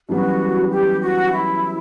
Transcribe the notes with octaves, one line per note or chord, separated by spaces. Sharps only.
F#2 E3 G3 B3 F#4
G4
F#4
E4